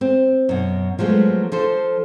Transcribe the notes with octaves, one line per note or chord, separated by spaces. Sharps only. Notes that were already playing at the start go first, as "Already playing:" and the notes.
C4
F#2 B2
F3 F#3 G#3 A3 B3
F3 A4 C5